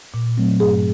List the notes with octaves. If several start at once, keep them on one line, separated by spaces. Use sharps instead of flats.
A#2
F#3 A3 C4
G2 G#4